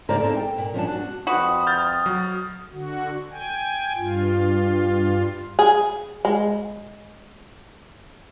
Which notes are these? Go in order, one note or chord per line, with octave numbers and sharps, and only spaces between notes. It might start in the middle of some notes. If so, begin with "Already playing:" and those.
A2 C#3 A#3 A#4 C5 D5
A#3 C4 D#4 A4
G5
A#2
F3 C#4 D4 A5
D4 F#4
F2 F#4 B4 D#6
F6 G6 A6
F#3
D3 F#4
G5 G#5
G2 F4
G#4
G#3